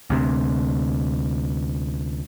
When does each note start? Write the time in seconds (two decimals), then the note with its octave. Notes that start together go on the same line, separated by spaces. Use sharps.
0.10 D2 C3